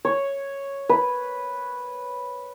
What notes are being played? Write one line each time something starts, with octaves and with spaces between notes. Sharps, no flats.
C#5
B4